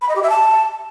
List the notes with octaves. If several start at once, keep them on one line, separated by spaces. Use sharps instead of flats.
B5
D#5
G4
E5
A5